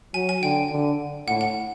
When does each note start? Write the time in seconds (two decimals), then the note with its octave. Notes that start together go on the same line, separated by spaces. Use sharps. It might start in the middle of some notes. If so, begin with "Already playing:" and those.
0.14 F#3 G#5
0.29 G#5
0.43 D3 G5
0.71 D3
1.28 A2 F#5
1.41 F#5